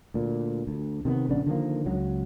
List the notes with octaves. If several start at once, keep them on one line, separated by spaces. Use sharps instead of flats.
D2 A#2
D2
C3 D#3 G3 B3
A#1 C#3 B3 D4
D3 D#3 F3 A#3
C#2 F#3